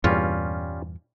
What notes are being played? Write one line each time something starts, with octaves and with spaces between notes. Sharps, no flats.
E2 G2 A#2 G3 C#4 F4